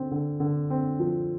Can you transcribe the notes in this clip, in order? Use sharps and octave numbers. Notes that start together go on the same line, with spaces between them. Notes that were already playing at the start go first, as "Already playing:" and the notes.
Already playing: D3 C4
D3
D3
C4
F3